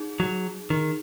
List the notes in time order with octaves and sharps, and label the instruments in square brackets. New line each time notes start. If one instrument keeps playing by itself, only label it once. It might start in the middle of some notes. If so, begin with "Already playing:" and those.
Already playing: [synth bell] D#4 G#4
[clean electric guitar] F#3
D#3